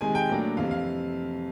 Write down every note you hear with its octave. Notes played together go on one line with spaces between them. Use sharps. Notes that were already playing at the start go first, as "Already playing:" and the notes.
C3 D#3 G#3 G#5
G5
A2 F#3 A#3 D4
F2 C3 E3 F5
F5